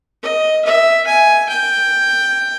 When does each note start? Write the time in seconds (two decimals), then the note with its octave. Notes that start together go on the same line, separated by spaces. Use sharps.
0.23 D#5
0.65 E5
1.07 G#5
1.49 G5